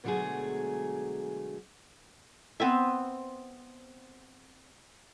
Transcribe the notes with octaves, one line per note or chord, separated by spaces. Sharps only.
B2 D3 F#3 G#3 A3 G#4
B3 C4 B4 E5